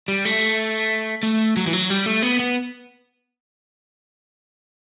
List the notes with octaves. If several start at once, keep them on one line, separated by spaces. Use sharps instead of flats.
G3
A3
A3
F#3
E3
F#3
G3
A3
B3
B3